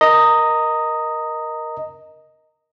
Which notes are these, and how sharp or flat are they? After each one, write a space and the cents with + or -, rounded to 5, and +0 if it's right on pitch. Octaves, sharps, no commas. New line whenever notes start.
A#4 +10 D#5 +0 A#5 -20